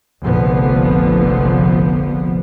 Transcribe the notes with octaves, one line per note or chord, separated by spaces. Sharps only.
F1 A#1 D3 F3 B3